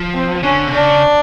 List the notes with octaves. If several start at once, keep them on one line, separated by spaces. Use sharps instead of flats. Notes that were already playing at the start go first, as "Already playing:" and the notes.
Already playing: F3
C4
D3 C#4
C3
C#3 D4